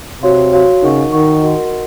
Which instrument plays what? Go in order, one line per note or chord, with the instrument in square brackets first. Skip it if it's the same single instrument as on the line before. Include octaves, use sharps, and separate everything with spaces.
[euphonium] C3 [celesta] F#4 C#5 F5 C6
[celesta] F#4 C#5 F5 C6
[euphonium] C#3 [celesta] D#4 A#4 D#5 F#5 C#6
[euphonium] D#3 [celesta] D#4 A#4 D#5 F#5 C#6
[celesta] F#4 A#4 D#5 F#5 C6